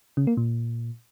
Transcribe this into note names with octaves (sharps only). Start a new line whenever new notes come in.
C#3
A#3
A#2